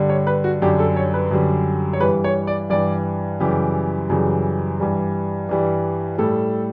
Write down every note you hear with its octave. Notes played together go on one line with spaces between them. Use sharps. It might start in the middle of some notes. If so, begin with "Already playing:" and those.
Already playing: G2 D3 G3
C#5
B4
F#4
F#2 D3 G3 G4
A4
C#5
B4
F#2 D3 G3
C#5
G2 E3 G3 B4
C#5
D5
G2 E3 G3 D5
F#2 C#3 E3 G3 G4
F#2 C#3 E3 G3
G2 E3 G3
G2 E3 G3
A2 G3 A4